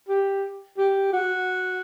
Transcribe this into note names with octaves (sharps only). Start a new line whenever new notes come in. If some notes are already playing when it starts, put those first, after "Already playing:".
G4
G4
F#4